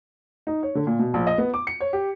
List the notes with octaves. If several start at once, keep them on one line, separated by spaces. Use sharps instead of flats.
D#4
C#5
D3
A#2
B2
A#1
D#5
B3
D6
C#7
C#5
G4